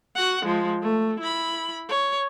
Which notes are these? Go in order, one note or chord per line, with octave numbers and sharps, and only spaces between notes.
F#4 F#5
F3 G#3
A3
E4 B5
C#5